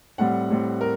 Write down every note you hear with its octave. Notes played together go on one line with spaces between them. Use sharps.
A2 G3 C4 F#5
A2 G3 C4
A#4